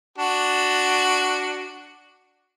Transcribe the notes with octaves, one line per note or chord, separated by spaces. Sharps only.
D4 F#4